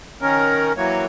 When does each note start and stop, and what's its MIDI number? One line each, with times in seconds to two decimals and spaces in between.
0.21 0.72 51
0.21 0.72 61
0.21 0.72 70
0.77 1.06 52
0.77 1.06 54
0.77 1.06 58
0.77 1.06 73